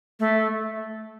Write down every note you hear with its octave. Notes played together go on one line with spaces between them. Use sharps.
A3